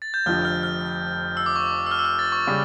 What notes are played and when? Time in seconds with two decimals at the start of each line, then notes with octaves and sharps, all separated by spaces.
0.02 A6
0.14 G6
0.26 F1 F2 D3 F3 F6
0.45 F6
0.63 F6
1.37 E6
1.46 D6
1.56 C#6
1.66 D6
1.86 E6
1.91 F6
1.99 E6
2.05 F6
2.19 A6
2.32 C#6
2.47 C#3 G3